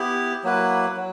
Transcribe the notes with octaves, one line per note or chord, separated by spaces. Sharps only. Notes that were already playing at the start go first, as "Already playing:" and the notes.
Already playing: B3 E4 G4
F#3 A#3 E4 B4
F#3